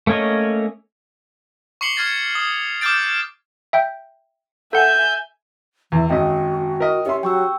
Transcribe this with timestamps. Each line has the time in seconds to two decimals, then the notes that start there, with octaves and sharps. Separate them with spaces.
0.07 A3 A#3 C#4 C#5 D#5
1.81 C#6 D6 C7 C#7 F#7 G7
1.96 C#6 F6 G#6 A6 C7
2.35 D#6
2.81 D6 D#6 F6 G6 A6 D7
3.73 E5 G5 G6
4.73 A4 E5 F#5 G#5 G6
5.92 E2 E3
6.10 G#1 F#2 F#4 D#5 G5
6.80 A#4 D#5
7.06 C#4 G4 E5 C6
7.23 F#3 G5 C#6 E6